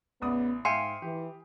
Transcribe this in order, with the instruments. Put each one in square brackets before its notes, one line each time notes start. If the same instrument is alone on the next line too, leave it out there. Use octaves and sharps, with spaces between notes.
[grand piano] A1 D5 D#6 [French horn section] C#3 B3
[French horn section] G#2 [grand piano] E5 F5 G5 [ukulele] G#5 [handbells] C6 C7 C#7
[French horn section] E3 [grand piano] G4